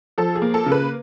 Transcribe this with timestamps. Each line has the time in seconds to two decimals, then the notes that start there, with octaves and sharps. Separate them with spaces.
0.18 F3 A4
0.35 G#4
0.42 A#3
0.54 A4
0.66 C#3
0.72 B4